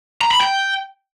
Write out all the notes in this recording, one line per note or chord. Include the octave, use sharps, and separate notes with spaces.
A#5
B5
G5